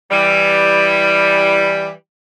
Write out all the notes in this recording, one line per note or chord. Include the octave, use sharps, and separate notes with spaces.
E3 G3